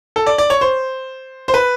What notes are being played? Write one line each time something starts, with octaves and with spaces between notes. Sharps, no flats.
A4
D5
D5
C#5
C5
C5
B4